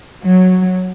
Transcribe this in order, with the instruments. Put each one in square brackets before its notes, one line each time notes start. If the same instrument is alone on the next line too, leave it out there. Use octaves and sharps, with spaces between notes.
[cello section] F#3